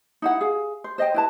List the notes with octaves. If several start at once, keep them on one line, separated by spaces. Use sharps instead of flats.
D#4 E4 F#5
G#4 F5
C5
C5 D#5 E5 G5
E4 B4 A5